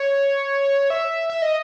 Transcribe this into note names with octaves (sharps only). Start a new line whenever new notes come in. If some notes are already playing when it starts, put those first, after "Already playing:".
Already playing: C#5
E5
E5
D#5